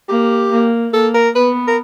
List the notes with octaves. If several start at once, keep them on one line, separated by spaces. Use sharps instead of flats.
A#3 G4
A#3
A#3 A4
A#4
B3 B4
A#4